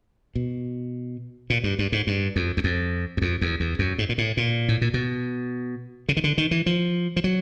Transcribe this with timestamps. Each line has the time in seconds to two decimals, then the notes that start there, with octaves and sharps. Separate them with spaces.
0.35 B2
1.50 A#2
1.64 G2
1.79 G2
1.92 G#2
2.07 G2
2.36 F2
2.57 E2
2.64 F2
3.17 F#2
3.22 F2
3.41 E2
3.60 E2
3.79 F#2
3.98 G#2
4.09 A#2
4.18 A2
4.37 A#2
4.68 A2
4.81 A#2
4.94 B2
6.09 C#3
6.17 D#3
6.24 D3
6.38 D#3
6.51 E3
6.66 F3
7.16 F3
7.24 F#3